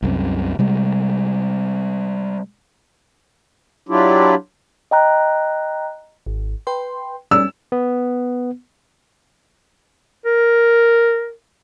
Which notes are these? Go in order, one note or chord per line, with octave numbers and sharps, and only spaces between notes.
C2 F#2 C3
C3 G3 G#3
F#3 D4 E4 F4 G4
D#5 G5 A#5 F#6
G#1
B4 G5 C6
G3 C#4 E6
B3
A#4